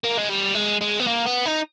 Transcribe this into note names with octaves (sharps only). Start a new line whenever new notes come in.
A#3
G#3
G3
G#3
G#3
B3
A#3
B3
D#4